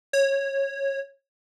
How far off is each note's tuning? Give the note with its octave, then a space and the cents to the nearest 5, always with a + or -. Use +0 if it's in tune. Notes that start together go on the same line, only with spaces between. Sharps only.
C#5 -15